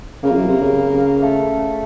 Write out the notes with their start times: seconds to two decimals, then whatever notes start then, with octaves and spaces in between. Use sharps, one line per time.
0.23 C#3 A#3
0.31 F2
0.36 F#2
0.48 C3
0.61 C#3
1.23 A3